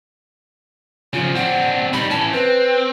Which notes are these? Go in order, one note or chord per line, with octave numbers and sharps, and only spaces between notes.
C#3 F3 F4
C4 D4 F#5
G3 D#4 B5
E3 C#4 A5
C4 B4